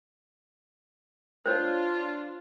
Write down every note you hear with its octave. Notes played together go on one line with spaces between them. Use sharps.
D4 F4 C5 C#5